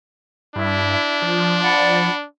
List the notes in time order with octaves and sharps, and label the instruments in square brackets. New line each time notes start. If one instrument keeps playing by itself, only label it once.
[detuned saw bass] G2 [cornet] D4 [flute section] E4
[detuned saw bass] F3
[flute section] D5 F#5 B5